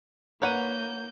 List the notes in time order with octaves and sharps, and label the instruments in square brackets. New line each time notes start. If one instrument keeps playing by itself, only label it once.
[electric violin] A#3 G6 [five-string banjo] A#4 B4 F#5 [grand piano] C#5 D#7